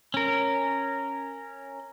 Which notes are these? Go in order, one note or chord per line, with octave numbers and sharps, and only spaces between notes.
C#4 A#4